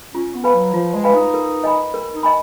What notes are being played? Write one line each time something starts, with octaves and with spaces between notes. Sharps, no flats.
C#4 F4
B3
B4 F5 G#5 B5
F#3
F3 F4
G#3
B4 F5 G#5 B5
D#4
A#4
D#5 G#5 B5
A#4
D#4
D#5 G#5 B5